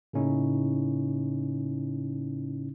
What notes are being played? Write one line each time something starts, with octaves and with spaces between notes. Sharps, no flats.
A2 C#3 A#3 C#4 D#4 E4